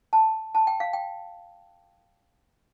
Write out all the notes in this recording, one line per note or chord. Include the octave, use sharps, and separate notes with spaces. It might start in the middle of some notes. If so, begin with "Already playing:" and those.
A5
A5
G5
F5
G5